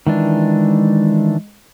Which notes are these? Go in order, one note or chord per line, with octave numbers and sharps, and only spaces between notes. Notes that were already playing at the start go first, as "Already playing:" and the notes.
D#3 E3 G#3 D4